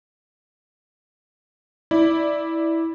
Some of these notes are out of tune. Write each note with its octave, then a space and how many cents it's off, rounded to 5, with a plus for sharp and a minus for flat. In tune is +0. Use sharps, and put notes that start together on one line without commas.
E4 -10 D5 +0